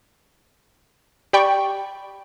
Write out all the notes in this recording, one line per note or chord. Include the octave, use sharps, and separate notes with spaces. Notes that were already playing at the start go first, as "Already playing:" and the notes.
G4 D5 G5 B5 C#6